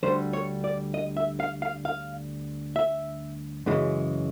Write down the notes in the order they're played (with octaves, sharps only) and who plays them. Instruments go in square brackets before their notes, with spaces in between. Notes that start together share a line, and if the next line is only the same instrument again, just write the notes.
[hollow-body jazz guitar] D2 D3 G3 C5
C#5
D5
D#5
E5
F5
F5
F5
E5
F#2 C#3 E3 G#3